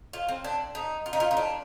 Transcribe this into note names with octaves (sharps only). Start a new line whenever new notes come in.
F4
C4
D4
D#4
F4
D#4
F4
D#4
D4